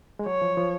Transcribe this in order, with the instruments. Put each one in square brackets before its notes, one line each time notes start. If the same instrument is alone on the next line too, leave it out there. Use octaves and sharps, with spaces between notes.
[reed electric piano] G#3
[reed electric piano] F#3 [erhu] C#5
[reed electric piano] F3
F3